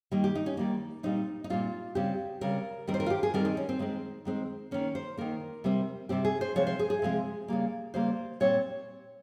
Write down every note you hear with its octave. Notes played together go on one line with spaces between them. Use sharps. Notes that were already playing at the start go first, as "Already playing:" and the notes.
D#3 G3 A#3
G4
D#4
C#4
D#3 G3 A#3
A#2 G3 C4 D#4
D#4
A#2 G3 C4 F4
C#3 G3 C4 G4
C#3 G3 C4 A#4
D#3 G3 C4 A#4
C5
A#4
F4
G4
G#4
D#3 G3 C4 A#4
D#4
C#4
C4
D#3 G#3 C4
D#3 G#3 C4
D#3 A#3 C#4
C5
D#3 A#3 A#4
C3 G3 C4
C3 G3 C4 G4
G#4
C5
C3 F3 G#3 C4 C#5
C5
G#4
G#4
C3 F3 G#3 C4
C#3 G3 A#3
C#3 G3 A#3 C5
A#2 G3 C4 C#5